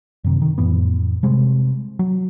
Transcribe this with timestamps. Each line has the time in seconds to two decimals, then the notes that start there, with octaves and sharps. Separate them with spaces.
0.24 F#2 C3 D#3
0.42 D#3
0.58 F2 A2 E3 B3
1.23 C3 G3 G#3 C4
1.99 F#3